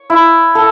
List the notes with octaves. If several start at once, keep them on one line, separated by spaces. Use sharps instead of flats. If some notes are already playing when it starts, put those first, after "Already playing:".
Already playing: C#5
E4
A4